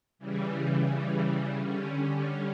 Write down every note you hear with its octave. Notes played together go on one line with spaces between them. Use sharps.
C#3 E3 G3
D3 G3 C#4